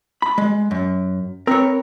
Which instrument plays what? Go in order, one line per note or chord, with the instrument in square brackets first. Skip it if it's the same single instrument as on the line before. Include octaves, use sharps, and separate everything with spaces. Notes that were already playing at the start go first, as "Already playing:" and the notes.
[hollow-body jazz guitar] B5
G#3
F#2
[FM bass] C4 [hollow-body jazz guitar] A#4 B4 C#5